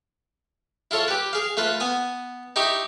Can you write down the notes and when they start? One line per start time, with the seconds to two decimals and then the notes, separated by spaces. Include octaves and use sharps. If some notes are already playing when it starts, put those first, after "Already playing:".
0.91 E4 F4 A4 C#5
1.08 G4 B4
1.33 G#4 F5
1.57 A3 F4 B4
1.80 B3 G#5 D#6
2.56 D#4 E4 G4 C#6 D#6